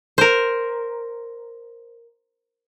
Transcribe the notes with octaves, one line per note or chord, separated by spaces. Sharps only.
A#4 C5